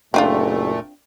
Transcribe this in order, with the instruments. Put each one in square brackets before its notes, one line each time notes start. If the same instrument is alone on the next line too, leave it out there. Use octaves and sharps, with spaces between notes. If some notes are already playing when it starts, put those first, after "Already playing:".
[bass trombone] F#1 [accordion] A#2 A3 [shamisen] C4 D4 F4